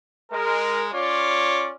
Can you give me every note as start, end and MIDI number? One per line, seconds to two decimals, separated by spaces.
0.32 0.87 56
0.32 0.87 70
0.92 1.72 61
0.92 1.72 65
0.92 1.72 73
0.92 1.72 74